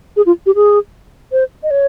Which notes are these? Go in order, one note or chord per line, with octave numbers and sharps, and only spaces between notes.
G#4
F4
G4
G#4
C5
D#5
C#5